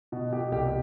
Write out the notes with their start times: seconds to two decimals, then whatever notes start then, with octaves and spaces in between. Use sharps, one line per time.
0.12 B2
0.32 B2 G4
0.52 C2 G4